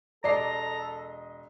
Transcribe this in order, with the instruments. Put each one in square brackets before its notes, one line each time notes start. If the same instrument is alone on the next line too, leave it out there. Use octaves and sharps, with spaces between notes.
[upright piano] E1 D#5 C7 [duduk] A4 [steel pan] D5 [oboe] A#5